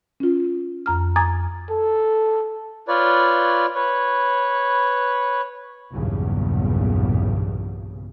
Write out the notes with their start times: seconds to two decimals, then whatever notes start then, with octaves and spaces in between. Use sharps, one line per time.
0.20 C#4 F4
0.86 F2 A#5 F6
1.16 G#5 A#5 D6 D#6 G#6 A6
1.70 A4
2.88 F4 B4 C#5 D5
3.75 B4 C#5
5.93 B1 E2 G2 A#2 C#3